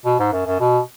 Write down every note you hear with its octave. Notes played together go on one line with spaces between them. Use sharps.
B2
G#2
F#2
F#2
B2